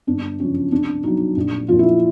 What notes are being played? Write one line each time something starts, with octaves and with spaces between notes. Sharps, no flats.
G1 D4
F#2 C#3 F3 C#4
C2 D4
B2 F#3 D#4
A#1
A#2 F3 F4
E4